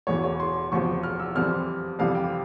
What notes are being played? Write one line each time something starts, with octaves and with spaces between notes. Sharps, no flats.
E1 E2 E3 C#5
C#5
C6
E1 E2 C3 F3 C#6
F6
E6
F2 E3 G3 C4 F6
F2 C3 E3 G3 F5
G5